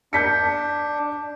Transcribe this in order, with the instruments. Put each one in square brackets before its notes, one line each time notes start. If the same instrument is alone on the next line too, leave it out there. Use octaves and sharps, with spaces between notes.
[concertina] D4 [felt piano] G6 B6 C#7